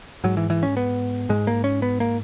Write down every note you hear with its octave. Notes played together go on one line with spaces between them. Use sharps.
G#2 F#3
E3
E3
C#4
B3
G#2 G#3
A#3
C#4
B3
A#3